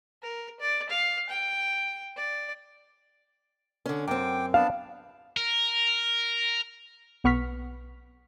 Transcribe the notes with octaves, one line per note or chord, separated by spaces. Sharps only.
A#4
D5
F5
G5
D5
D3 C#4
F#2 C4 G5 D6
B3 D4 F5 A5
A#4
B1 B3 C#6 F6 B6